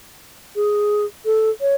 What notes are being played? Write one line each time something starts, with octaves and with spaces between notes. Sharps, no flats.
G#4
A4
C#5